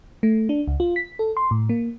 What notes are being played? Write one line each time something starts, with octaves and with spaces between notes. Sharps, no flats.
A3
D4
C#2
F4
B6
A4
C6
A2
A#3